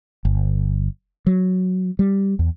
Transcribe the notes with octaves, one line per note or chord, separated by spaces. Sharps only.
G1
F#3
G3
E2